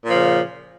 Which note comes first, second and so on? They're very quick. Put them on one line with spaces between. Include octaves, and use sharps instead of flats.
A#2 F3 C#3